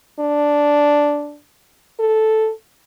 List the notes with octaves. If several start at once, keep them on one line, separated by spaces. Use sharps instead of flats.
D4
A4